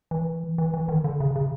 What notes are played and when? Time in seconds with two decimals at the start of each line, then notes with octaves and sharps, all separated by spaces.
0.11 E3
0.58 E3
0.74 E3
0.88 D#3
1.04 D3
1.20 C#3
1.36 C#3